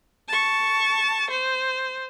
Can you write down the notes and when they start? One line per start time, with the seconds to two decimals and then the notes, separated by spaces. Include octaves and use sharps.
0.28 A5 C#6
1.30 C5